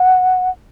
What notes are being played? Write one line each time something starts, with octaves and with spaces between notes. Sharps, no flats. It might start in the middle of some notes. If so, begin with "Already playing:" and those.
Already playing: F#5